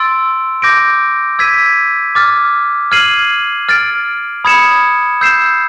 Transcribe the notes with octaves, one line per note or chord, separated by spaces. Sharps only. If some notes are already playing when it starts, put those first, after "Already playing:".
Already playing: C6 E6 A6 D7
D6 G6 A#6 D7
E6 G#6 B6 D#7
D6 F6 A6
F6 G#6 C7 D#7 F#7
F6 A6 D7
B5 D#6 G#6 C#7 E7
E6 G6 C7 E7